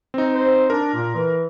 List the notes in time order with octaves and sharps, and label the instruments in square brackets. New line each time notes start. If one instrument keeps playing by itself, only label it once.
[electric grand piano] C4 D#4
[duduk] C5
[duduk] D4 [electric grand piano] A#4
[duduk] A#2
E3